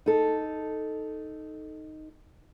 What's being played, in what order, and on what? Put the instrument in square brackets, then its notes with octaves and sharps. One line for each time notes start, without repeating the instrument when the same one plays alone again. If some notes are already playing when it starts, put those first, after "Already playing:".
[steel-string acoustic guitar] D#4 A4